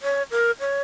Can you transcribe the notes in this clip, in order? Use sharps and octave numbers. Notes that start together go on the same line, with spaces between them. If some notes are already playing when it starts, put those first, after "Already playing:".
C#5
A#4
C#5